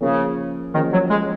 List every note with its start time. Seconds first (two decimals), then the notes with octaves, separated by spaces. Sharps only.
0.01 C#3 F3 A#3 C#4 G#4
0.74 D#3 F3 A#3 C#4 G#4
0.92 F#3
1.10 G#3